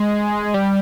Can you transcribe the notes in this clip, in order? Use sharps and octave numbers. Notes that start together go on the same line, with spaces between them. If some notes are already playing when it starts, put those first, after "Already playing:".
Already playing: G#3
G3